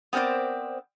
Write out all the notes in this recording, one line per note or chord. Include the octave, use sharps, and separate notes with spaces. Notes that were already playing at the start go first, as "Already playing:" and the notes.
B3 C4 A#4 C5 D5